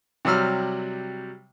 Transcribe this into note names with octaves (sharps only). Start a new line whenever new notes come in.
C3 F#3 G3 E6 F6